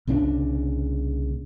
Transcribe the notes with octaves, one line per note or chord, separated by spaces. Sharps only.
C2 A#2 C#3 D4